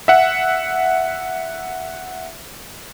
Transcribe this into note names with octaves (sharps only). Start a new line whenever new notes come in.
E5 F#5